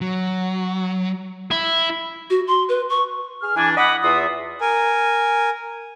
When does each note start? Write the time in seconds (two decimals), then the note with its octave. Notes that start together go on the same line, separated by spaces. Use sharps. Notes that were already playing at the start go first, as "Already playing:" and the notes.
0.01 F#3
1.51 E4
2.30 F#4
2.48 C6
2.69 B4
2.90 C#6
3.42 G#4 F6
3.56 E3 D4 G#5
3.77 D#5 F#5 B5 D6
4.02 E2 F4 E5 D#6
4.61 A#4 G#5